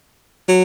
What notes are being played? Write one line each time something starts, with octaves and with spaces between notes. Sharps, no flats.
F#3